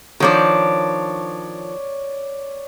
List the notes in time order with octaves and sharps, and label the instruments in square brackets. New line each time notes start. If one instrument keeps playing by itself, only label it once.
[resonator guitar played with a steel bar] D#3 F3 D4 [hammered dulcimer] C#5 D5